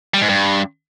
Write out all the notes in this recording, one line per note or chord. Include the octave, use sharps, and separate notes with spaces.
G3
G#2
G2